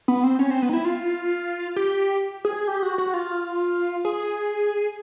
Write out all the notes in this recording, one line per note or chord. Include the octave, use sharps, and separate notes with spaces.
B3
C4
C#4
C4
B3
D#4
E4
F4
G4
G#4
G4
F#4
F#4
F4
G#4